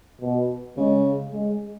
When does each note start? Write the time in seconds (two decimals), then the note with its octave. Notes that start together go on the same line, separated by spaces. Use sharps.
0.21 B2
0.77 C#3 G#3
1.32 G#3